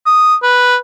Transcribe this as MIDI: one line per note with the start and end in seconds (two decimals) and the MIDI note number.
0.06 0.35 87
0.43 0.76 71